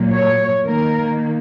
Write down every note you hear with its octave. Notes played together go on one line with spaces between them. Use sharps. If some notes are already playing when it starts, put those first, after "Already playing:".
Already playing: A#2 F#3 A#3
C#5
D#3 A#3 A#4